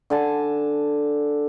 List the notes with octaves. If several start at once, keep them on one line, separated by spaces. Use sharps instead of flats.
D3 G#5 A5